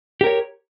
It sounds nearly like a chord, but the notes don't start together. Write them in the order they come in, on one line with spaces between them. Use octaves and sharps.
G4 A#4 C#5